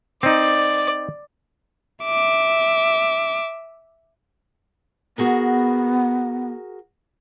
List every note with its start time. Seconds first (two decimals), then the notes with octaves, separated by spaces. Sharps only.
0.23 C4 D#4 D5
2.05 E5 D6
5.18 B3 F#4 G#4 A#4